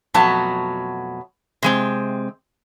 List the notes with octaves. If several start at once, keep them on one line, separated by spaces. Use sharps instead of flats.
F2 B2 F#3 A3 A5
C3 G#3 C4